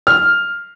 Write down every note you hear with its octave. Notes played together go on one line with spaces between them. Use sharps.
F6